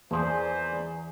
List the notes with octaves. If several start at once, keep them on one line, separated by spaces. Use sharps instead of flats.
E2 E3 F3 A#3 G#4 B4 C5 D5